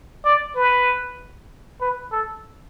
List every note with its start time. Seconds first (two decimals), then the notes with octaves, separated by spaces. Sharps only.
0.25 D5
0.56 B4
1.81 B4
2.12 A4